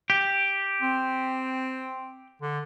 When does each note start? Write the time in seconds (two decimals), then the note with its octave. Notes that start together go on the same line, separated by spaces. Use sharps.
0.10 G4
0.82 C4
2.42 D3